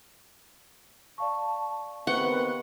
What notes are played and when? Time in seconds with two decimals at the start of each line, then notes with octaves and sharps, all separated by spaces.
1.18 D5 F5 A5 C#6
2.07 D#2 B3 C4 B4 F#5 C#6 C#7 G7